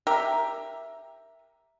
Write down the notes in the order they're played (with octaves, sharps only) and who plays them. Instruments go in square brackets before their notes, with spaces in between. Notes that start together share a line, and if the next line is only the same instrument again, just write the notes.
[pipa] G4 A#4 E5